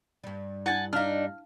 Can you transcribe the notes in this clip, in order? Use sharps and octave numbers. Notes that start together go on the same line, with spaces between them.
G2 G3
D4 E4 F#5 G#5 A5
D4 D#4 F5 A5 F6